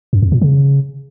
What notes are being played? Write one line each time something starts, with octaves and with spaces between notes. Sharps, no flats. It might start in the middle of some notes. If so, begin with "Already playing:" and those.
F#2
F2
A#2
C#3